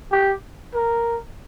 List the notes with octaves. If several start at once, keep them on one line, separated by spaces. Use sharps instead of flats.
G4
A#4